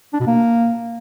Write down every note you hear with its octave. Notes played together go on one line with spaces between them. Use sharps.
D4
B2
A#3